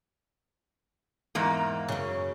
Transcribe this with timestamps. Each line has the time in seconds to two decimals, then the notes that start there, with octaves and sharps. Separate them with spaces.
1.35 E2 G#2 A#3
1.89 F#2 C#3